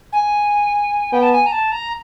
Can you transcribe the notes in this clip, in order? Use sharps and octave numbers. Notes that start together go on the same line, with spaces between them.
G#5
B3 G5
A5
G#5
A#5
A5
A#5